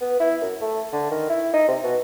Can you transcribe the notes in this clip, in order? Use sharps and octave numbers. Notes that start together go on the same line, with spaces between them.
B3
E4
F#2
A3
D3
D#3
E4
D#4
C3
B2